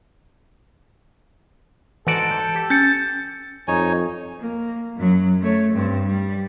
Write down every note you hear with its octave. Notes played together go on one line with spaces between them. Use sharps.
G#2 E3 F#4 A4 D5
G6
G4
C#4 G6 A6 C#7
F2 D#4 C#5 G#5
A#3
F#2 F#3
A3 C#5
G2 C4
G3